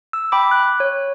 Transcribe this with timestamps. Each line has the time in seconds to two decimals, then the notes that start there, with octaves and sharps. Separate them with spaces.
0.13 E6
0.32 G5 B5 D6
0.51 F#6
0.80 C#5